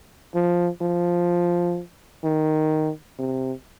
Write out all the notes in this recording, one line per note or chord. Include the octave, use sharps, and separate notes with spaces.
F3
F3
D#3
C3